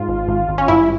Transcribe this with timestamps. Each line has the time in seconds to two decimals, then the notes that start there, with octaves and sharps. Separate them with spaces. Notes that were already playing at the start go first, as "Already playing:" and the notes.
Already playing: G#2 F4
0.08 G#1
0.28 G#1
0.49 G#1
0.58 C#4
0.68 G2 E4